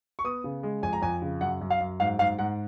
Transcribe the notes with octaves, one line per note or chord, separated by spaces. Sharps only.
C#6
B3 D#6
C#3
G#3
F2 G#5
A#5
F2 G#5
C#3
F#2 F#5
F#2
F5
F#2
G#2 F5
G#2 F5
G#2 F#5